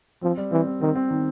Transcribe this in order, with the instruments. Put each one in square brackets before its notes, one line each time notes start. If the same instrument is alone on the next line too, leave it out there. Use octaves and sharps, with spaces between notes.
[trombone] F3 [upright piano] C4
[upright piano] G3
[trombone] E3 [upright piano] C4
[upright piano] C4
[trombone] D#3 [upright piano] C4
[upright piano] C4
D#3